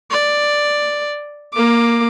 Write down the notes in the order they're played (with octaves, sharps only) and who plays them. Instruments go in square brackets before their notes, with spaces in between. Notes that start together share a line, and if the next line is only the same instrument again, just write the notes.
[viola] D5
A#3 D6